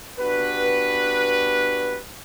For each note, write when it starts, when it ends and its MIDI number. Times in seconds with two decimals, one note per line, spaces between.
0.19 1.98 59
0.19 1.98 62
0.19 1.98 66
0.19 1.98 67
0.19 1.98 71